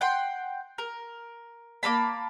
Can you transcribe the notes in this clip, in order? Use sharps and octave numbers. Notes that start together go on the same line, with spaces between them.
F#5 G5 C6
A#4
A#3 C4 A5 B5